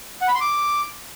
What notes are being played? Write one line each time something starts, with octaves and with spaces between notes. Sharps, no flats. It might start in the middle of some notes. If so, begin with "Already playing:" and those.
F#5
B5
C6
D6